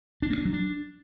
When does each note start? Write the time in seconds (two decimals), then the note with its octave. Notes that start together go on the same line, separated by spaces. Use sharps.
0.22 D4
0.30 A#3
0.38 D4
0.45 F#3
0.53 D4